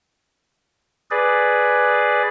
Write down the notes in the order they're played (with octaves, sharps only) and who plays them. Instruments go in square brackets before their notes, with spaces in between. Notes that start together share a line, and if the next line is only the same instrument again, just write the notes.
[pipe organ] G#4 B4 D5